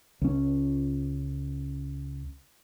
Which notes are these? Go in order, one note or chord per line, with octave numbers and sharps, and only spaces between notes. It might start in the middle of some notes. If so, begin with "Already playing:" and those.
C#2 C#4